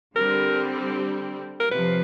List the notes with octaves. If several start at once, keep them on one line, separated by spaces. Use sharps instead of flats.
D3 G3 C4 A#4
A#4
C3 F3 B4